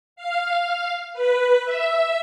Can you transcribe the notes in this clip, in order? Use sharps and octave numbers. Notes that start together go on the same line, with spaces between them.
F5
B4
E5